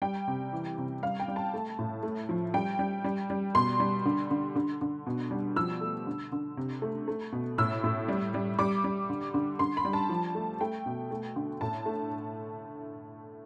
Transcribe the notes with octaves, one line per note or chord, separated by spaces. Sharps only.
G3 G5
C3
E3
C3
G3 F5
G5
G3
A5
A3
A2
A3
F3
G3 G5
G3
G3
G3
B2 C6
G3
D3
D3
D3
D3
B2
G3
F3 E6
A3
D3
D3
C3
A3
A3
B2
A2 E6
A2
G3
G3
G3 D6
G3
D3
D3
D3 C6
B5
G3
A5
F3
A3
A3 G5
B2
A3
D3
A2 A5
A3